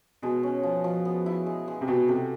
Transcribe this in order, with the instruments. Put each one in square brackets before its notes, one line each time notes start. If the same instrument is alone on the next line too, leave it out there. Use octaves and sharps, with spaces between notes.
[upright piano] B2 [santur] G#3
[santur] C#4
F3
F3
B3
E4
G#3
G#3
[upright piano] C3
[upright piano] B2 [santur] F#4
[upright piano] C3 [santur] A4